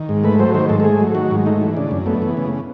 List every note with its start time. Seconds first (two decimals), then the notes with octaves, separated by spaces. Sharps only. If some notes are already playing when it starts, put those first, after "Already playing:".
Already playing: D#3
0.09 G#2
0.24 A3 B4
0.39 F#3 C5
0.54 D#3 C5
0.69 G#2 A4
0.80 A4
0.84 A3 G#4
1.00 F#3
1.15 D#3 F#4
1.31 G#2
1.46 A3 D#4
1.61 E3
1.77 C#3 D4
1.91 F#2
2.06 A3 B3
2.22 E3
2.37 C#3